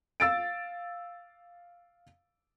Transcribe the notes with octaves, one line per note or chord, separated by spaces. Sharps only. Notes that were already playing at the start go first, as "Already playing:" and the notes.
F5 E6 A6 D7